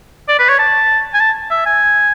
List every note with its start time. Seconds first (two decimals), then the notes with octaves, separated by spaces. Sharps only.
0.28 D5
0.39 B4
0.49 C#5
0.59 A5
1.14 G#5
1.20 A5
1.50 E5
1.66 G#5